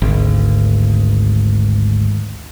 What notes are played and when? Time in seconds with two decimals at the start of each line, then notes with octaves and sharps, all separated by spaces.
0.02 G#1 D2